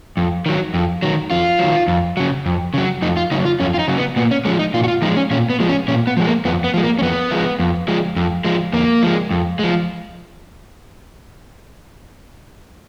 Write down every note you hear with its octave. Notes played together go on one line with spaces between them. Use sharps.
F2
D#3 F#3
F2
D#3 F#3
F2 F4
D#3 F#3
F2
C#3 F#3
F2
C#3 F#3
F2 D#4
F4
C#3 F#3 D#4
F4
F2 C#4
F4
D#4
C#3 F#3
B3
A#2 B3
C#4
F3 G#3 C#4
D#4
A#2 F4
F#4
F4
F3 G#3 D#4
C#4
A#2 C#4
B3
F3 G#3
C#4
A#2 C#4
B3
F3 G#3
A#3
F2 B3
B3
F3 G#3
A#3
C#4
F2 B3
F3 G#3
F2
F3 G#3
F2
F3 G#3
F2 A#3
F3 G#3
F2
F3 G#3